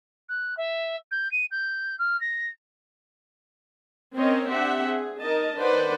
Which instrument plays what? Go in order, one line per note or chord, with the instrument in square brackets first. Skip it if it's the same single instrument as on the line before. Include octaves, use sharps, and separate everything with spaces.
[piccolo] F#6
E5
G6
D#7
G6
F6
A#6
[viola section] C4 C#4 A#4 C5 C#5 D#5
C4 D4 G4 E5 F#5
G#4
D#4 A#4 D#5 A5
D#3 D4 B4 C5 D5 F#5